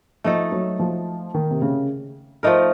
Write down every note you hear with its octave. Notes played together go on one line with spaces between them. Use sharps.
F3 A3 D#4 A4
F#3
F3
D#3
C3
C#3
F3 A3 D#4 A#4